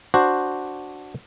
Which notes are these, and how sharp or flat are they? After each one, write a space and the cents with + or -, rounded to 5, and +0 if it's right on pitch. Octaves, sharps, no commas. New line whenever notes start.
D4 +0 F#4 +0 C5 +0